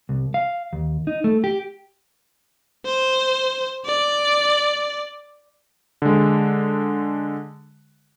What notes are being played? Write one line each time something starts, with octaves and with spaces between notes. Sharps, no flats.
C2
F5
D#2
D#4
A3
G4
C5
D5
D3 G#3